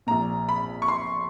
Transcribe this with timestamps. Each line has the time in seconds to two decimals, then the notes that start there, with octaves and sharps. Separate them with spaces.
0.07 A#1 A#2 A#5
0.49 B5
0.82 C#6
0.88 C6